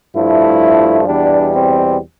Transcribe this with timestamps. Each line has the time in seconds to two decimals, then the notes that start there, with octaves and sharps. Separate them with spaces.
0.15 G2 F3 A3 E4
1.07 E2 B2 G3 D4
1.54 C4